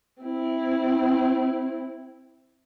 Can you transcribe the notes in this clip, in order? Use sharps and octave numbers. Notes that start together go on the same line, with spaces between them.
C4 E4